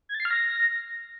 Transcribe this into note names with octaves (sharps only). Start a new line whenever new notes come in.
G#6
A6
C7
F6
A#6